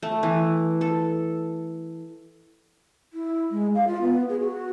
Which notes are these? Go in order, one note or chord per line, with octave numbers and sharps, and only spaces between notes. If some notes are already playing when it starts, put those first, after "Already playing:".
A3
E3
A4
E4
G#3
F5
F4
B3
G#4
F#4